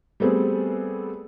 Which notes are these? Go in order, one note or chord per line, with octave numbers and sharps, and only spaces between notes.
G3 A3 B3 C4 G#4